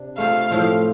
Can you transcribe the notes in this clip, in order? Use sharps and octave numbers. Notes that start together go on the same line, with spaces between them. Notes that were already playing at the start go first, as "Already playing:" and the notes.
Already playing: C3 D4
A3 C4 F4 F5
A2 F3 C4